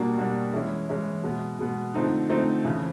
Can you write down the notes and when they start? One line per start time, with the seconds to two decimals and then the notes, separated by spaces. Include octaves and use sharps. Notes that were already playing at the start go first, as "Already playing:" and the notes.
Already playing: B2 G3 A#3 D4 F#4
0.18 B2 G3 A#3 D4 F#4
0.53 E3 G#3 C#4 E4
0.89 E3 G#3 C#4 E4
1.23 B2 G#3 B3
1.59 B2 G#3 B3
1.94 D3 F3 A3 C4 D#4
2.30 D3 F3 A3 C4 D#4
2.65 F2 C#3 E3